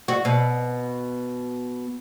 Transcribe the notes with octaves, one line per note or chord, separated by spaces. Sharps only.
F#4
B2